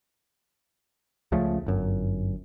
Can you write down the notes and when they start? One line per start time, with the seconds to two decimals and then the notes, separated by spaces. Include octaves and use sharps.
1.32 C#2 C#3 F3 A3
1.66 G1 F#2